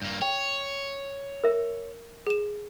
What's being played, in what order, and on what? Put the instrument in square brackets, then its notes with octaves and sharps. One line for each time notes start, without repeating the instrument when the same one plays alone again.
[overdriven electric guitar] G2 A#3
[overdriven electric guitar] C#5 [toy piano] G5
[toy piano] A#4 E5
[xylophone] G#4 E7